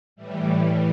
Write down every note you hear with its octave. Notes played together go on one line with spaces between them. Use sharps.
A2 E3 G3